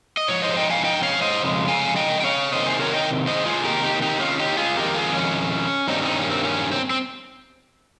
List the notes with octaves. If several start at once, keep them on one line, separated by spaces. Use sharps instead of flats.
D#5
G#2 F3 C#5
C5 D#5
D#5 G5
F5 G#5
D#5 G5
C#5 F5
C5 D#5
F2 C#3 G#3
F5 G#5
D#5 G5
G5
C#5 F5
C3 D#3 A#3 C5 D#5
G#4 C5
A#4 C#5
D#5 G5
C5 D#5
F4 G#4
C3 D#3 A#3 G4 A#4
D#4 G4
D#4 G4
C#4 F4
D#4 G4
F4 G#4
F2 D#3 G#3 G4 A#4
F4 G#4
C#4
G2 D#3 G3 A#3 C4 D#4
C4 D#4
C#4
C4
C#4
C4
C4